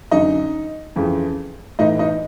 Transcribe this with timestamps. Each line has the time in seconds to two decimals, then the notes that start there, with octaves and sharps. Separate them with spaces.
0.11 F#2 D3 D#4 D#5
0.96 F2 C#3 E3
1.79 A2 E3 D#4 D#5
1.99 D#4 D#5